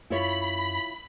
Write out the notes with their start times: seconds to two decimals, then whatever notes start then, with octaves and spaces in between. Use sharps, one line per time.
0.10 F#2 E4 F4 C#5 B5